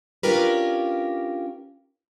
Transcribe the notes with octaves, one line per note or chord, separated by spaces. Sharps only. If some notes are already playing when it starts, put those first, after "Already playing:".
C#4 D4 F4 G4 A#4 B4